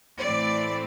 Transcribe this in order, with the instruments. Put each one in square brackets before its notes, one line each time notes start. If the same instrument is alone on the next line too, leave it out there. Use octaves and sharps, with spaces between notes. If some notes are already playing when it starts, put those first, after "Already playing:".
[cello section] A2 E3 A3 C4 D5